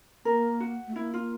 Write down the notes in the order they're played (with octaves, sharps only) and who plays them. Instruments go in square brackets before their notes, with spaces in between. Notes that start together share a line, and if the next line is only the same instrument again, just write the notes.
[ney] A#3 [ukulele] A#4
[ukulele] F#4
[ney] A3
[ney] A#3 [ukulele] E4
[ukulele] F4